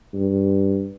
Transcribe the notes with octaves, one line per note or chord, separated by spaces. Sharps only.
G2